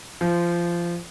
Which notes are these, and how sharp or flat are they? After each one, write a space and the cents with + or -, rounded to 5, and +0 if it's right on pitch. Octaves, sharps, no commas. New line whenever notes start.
F3 -20